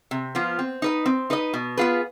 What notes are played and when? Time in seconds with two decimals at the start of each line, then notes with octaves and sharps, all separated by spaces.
0.11 C3
0.35 F3 B3 F4
0.59 C4
0.82 D#4 B4 D#5
1.06 C4
1.30 D#4 B4 D#5
1.54 B2
1.77 B3 F4 G#4 B4